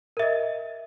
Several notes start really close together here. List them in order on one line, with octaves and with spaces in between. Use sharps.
A#4 E5 D#5